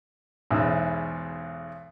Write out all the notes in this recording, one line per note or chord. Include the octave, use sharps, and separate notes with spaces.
B1 E2 G#2 E3